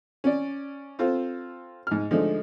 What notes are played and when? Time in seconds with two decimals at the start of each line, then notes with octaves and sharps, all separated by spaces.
0.24 C#4 D5
0.99 C4 F4 A4 C5
1.87 G#2 F6
2.11 D3 F3 G#3 A3 D4 D#4